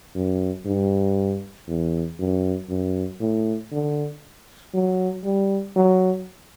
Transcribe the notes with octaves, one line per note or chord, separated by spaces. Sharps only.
F#2
G2
E2
F#2
F#2
A2
D3
F#3
G3
F#3